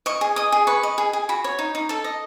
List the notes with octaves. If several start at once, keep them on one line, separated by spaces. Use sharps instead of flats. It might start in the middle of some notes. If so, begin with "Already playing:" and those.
D#5 C#6
G#4
D#5 D#6
G#4
B4 C#6
D#5
G#4
G#4
F#4 B5
C#5
D#4
D#4
A4 A5
D#5